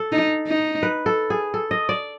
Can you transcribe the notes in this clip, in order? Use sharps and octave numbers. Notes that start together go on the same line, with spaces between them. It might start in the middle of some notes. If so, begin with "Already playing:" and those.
Already playing: A4
D#4
D#4
B4
A4
G#4
A4
D#5
D5